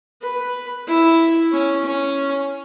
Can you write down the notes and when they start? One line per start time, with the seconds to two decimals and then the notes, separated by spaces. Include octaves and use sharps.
0.22 B4
0.87 E4
1.52 C#4
1.84 C#4